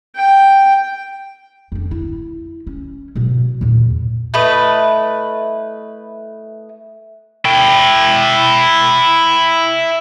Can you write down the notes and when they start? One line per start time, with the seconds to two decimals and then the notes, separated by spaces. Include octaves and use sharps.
0.16 G5
1.72 F2 D4
1.91 E4
2.67 C#4
3.15 B2 F#3
3.61 E2 A#2
4.34 A3 E4 B4 D#5
7.45 E4 G5